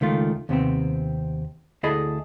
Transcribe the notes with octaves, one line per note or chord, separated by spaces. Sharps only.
C#2 D#3 A3 F4
D#2 C3 B3 C4
D2 E4 G#4 A4 D#5 B5